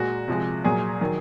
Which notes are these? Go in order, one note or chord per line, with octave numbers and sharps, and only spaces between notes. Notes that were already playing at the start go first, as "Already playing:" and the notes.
Already playing: A#2 G#3 F#4
C3 F3 G#3
A#2 F#3 G#4
D#3 F#3